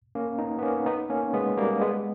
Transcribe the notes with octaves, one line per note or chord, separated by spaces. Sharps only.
A#3 C#4
B3 D#4
B3
A#3 C#4
B3 D#4
A#3 C#4
G#3 B3
G3 A#3
G#3 B3